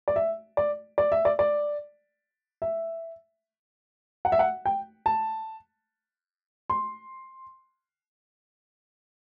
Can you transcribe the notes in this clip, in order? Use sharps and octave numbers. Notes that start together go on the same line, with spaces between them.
D5
E5
D5
D5
E5
D5
D5
E5
F#5
E5
F#5
G5
A5
C6